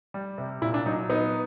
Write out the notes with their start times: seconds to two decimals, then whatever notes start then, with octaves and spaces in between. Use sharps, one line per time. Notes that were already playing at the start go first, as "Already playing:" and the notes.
0.14 G3
0.38 C3
0.62 A#2 E4
0.74 D4
0.86 F#3 D#4
1.10 B3 D#4